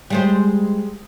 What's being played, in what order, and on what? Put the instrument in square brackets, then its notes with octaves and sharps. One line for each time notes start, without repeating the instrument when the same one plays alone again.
[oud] G3 G#3 C5